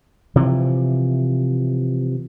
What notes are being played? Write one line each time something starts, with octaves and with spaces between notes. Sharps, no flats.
C3 E3 F3